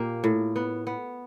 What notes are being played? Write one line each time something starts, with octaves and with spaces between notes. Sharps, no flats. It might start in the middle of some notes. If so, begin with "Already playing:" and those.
Already playing: A#2 A#3 G4
A2
B3
B3